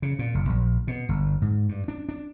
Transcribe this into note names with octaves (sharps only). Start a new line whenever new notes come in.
C#3
A#2
F#1
A#1
B2
G1
G#2
G2
D4
D4